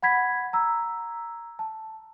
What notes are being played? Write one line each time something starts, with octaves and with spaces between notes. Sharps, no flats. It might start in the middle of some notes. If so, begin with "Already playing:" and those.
F#5 B5 G#6 B6
A#5 E6
A5